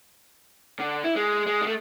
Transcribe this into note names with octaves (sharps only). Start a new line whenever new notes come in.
D3
E4
G#3
G#3
G#3 A3